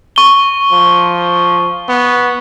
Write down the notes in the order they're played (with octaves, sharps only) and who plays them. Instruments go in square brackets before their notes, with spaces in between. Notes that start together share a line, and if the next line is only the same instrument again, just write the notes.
[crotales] C#6 G7
[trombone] F3
B3